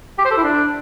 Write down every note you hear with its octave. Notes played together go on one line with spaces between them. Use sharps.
G4
C5
A4
E4
D4